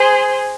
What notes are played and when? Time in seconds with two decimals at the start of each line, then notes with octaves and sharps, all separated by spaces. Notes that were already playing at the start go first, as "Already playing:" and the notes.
Already playing: G#4 C5